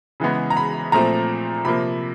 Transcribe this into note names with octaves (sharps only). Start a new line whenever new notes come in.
C#3 E3 G#3 B3
A#5
B5
A#2 F3 A3 C4 A#5
C3 F3 A#3 B5